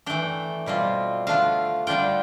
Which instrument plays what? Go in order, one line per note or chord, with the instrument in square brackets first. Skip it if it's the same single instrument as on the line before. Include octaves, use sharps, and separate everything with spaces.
[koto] E3 A3 D4 G5
B2 G3 C4 F4
D3 A3 D4 F4 F5
D3 G3 D4 F4 G5